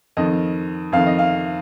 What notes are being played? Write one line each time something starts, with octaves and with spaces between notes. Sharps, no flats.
F2 D#3 D#5
F2 D#3 F5
D#5
F5